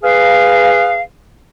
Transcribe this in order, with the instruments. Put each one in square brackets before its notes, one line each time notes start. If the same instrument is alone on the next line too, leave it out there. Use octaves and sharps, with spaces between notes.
[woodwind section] G#4 B4 F5